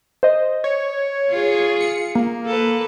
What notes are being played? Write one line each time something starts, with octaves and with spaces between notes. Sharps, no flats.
C5 D#5
C#5
F4 G#4
C#7
A#3
A4 B4